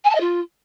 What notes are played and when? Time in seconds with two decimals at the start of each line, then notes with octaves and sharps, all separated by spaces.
0.04 G#5
0.09 A5
0.15 D#5
0.20 F4